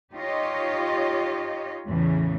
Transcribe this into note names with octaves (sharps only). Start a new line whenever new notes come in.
D#4 F4 G4 C#5 D#5
E2 A2 C#3 E3